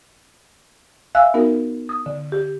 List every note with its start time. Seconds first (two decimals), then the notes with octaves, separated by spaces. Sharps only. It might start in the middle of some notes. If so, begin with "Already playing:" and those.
1.15 E5 F5 G#5 E6 F#6
1.34 B3 D#4 F#4 A#4
1.89 D#6
2.06 D3
2.32 G4